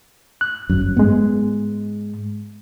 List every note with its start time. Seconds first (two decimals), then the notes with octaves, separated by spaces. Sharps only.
0.41 F#6
0.70 G1 F#2
0.96 G#2 G#3 B3